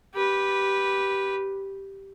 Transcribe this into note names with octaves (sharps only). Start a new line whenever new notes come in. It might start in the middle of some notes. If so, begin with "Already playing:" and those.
G4 B4